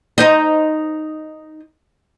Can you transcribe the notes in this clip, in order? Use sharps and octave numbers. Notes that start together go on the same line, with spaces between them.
D#4 C5 D#5